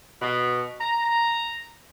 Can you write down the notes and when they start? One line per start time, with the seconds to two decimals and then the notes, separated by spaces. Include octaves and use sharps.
0.20 B2
0.80 A#5